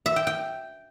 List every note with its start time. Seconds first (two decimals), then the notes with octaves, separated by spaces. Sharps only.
0.06 E5
0.16 G5
0.27 G5